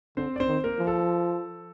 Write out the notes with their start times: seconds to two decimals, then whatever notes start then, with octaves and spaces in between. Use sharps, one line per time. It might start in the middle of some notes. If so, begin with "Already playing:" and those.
0.17 D3 C4 C5
0.36 D5
0.40 C4 C5
0.48 D#3
0.64 A#3 A#4
0.79 F3
0.87 A4